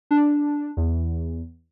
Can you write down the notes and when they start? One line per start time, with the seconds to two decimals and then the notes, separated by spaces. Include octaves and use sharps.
0.11 D4
0.77 E2